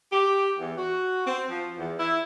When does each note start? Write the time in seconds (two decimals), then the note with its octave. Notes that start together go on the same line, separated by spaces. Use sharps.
0.13 G4
0.59 E2
0.77 F#4
1.27 C4
1.50 F3
1.77 E2
1.99 E4